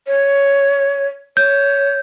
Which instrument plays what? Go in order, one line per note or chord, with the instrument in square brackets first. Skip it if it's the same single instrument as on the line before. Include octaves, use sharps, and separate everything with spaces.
[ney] C#5
[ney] C#5 [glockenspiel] G6